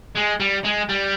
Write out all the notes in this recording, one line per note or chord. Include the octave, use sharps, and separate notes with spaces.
G#3
G3
G#3
G3